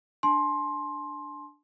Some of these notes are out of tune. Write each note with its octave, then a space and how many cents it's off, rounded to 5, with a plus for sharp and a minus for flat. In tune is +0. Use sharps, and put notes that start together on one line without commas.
D4 +0 G#5 +45 C6 +15